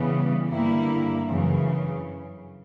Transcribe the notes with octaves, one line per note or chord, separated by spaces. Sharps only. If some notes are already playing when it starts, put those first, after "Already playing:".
Already playing: C#3 E3 G3 B3
G2 D3 G3 A#3 E4
F#2 C#3 E3